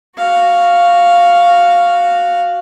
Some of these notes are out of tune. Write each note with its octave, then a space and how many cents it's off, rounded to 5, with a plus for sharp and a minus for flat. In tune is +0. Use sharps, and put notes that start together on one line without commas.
F#4 +0 F5 +0